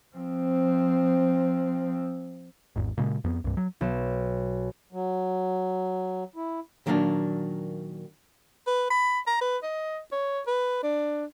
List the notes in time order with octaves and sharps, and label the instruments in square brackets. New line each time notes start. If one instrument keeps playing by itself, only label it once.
[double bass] F3 C4
[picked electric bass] G#1 E2 G#2
A#2 C#3 G#3
F2 B3
C2 G2
F#3
[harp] B1 E7
[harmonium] F#3
E4
[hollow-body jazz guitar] A#2 D#3 F#3 A#3 B3 D4
[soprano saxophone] B4
B5
A#5
B4
D#5
C#5
B4
D4